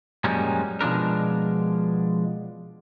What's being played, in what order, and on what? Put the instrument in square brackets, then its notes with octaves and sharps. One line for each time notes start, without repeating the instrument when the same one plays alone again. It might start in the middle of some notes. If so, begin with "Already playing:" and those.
[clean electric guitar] F#2 A#2 F3 G3 G#3 C#4
B2 F3 G#3 D4 A#4